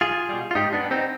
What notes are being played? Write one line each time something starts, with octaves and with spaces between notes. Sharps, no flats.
B1 F4 G#4
B2 G3
F4
G#2 D#4 G4
B3 D4
G3
C4 D#4